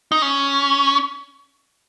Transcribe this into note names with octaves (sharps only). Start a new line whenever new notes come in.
D#4
C#4